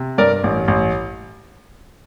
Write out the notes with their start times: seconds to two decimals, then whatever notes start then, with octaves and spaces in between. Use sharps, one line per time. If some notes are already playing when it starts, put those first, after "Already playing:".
Already playing: C3
0.18 G2 A#4 D5
0.44 A1
0.68 A1